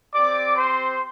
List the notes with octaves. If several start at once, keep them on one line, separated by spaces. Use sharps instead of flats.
C4 G4 D5 D6
C5 C6